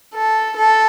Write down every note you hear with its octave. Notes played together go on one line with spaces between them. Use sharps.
A4
A4